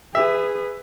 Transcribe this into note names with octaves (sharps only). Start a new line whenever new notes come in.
G#4 B4 E5